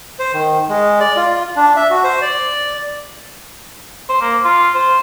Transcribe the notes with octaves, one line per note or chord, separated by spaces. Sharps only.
C5
D#3
G#3
D5
F4
D4
E5
F#4
C5
D5
C5
A#3
F4
C5